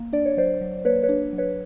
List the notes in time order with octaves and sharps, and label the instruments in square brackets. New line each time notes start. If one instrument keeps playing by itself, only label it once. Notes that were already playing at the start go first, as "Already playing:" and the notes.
Already playing: [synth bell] A#3
D4 D5
C#5
F#3 C5 D5
F#3
A#3 B4 C#5
B4 C#5
D4
F#3
B4 C#5